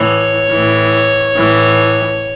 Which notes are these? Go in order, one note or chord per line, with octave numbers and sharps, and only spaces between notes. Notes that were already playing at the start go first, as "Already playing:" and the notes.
Already playing: A2 E3 C#5
A2 E3
A2 E3